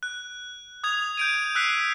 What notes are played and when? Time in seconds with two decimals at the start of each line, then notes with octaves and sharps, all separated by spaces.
0.03 F#6
0.84 D#6 G#6 F7
1.17 G6 D7 D#7
1.55 E6 F#6 B6 C7 F7